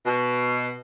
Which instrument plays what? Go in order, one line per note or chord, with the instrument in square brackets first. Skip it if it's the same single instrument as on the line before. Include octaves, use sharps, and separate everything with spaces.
[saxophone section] B2